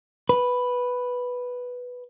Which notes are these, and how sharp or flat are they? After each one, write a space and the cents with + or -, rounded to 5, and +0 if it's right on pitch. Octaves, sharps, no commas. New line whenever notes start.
B4 +0